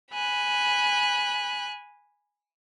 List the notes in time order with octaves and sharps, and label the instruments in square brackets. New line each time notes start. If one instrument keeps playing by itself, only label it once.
[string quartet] G#5 B5 F#6